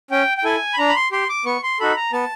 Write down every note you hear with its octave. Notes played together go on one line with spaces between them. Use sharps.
C#4 G5
G5
E4 A4 G#5
B5
D4 A#5
B5
C6
G4 C6
D6
B3 C#6
C6
D#4 F#4 A4 B5
A#5
B3 A5